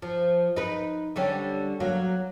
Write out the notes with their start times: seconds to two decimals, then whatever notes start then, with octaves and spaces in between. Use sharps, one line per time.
0.02 F3
0.56 D#4 B4
1.16 D3 G3 C#4
1.80 F#3 A#3